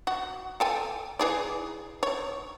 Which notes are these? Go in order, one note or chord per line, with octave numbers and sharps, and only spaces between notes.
F#4
A4 G5 G#5
E3 G#4 D5
C#5